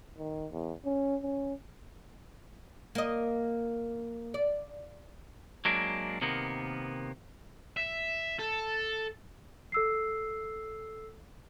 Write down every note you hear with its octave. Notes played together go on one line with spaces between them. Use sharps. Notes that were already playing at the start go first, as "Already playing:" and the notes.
D#3
E2
C#4
C#4
A#3 D#5
D5
F#3 G#3 A#3 D4
C3 D#3 A#3 B3
E5
A4
A4 E6 C7